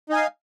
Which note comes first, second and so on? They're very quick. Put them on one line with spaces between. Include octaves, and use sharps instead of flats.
D#4 G#5 F5